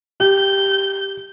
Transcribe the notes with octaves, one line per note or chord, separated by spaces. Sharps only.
G4 G6